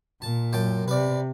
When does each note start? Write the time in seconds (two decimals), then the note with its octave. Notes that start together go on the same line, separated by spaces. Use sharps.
0.22 A#2 A5
0.53 F#2 G5 A5
0.88 C3 B4 D5